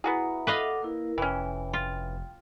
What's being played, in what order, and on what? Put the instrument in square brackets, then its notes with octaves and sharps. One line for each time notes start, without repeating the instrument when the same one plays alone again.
[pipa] B3 F#4 G#4 [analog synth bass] E4 [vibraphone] A#5
[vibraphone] A4 F#5 D6 [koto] B4 D#5 F5
[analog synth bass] A#3 [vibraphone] E4 A#4
[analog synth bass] F1 [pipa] E3 C#4 [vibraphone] G5
[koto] F4